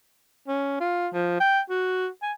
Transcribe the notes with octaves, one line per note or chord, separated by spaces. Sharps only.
C#4
F4
F3
G5
F#4
G#5